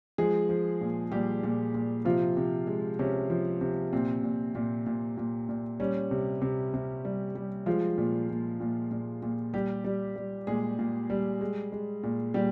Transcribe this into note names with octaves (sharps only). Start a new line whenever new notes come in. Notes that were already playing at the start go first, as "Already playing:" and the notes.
F3 G#3 G#4
F3
A#2
A#2 G3 G4
A#2
A#2
C3 F3 F4
C3
G#3
C3 C#4
F3
C3
A#2 C4
A#2
A#2
A#2
A#2
A#2
G3 C#4
C3
C3
C3
G3
G3
F3 G#3 F4
A#2
A#2
A#2
A#2
A#2
G3 G4
G3
G3
A#2 G#3 G#4
A#2
G3
G#3
G#3
A#2
A#2 G3 G4